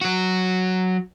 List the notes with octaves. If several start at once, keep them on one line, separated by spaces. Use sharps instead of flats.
F#3 F#4